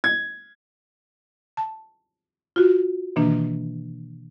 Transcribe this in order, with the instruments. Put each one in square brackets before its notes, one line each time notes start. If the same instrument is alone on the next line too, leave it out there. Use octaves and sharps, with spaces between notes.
[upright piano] G#6
[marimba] A5
F4 F#4
B2 D#3 E3 A#3 D4